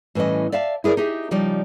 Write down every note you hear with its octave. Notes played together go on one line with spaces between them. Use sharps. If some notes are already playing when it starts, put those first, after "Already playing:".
A2 E3 G3 C#4 D#5
D5 E5 F5 A5
E4 G#4 A#4 D5
D#4 G4 G#4 E5
C#3 F3 G3 D#4 D5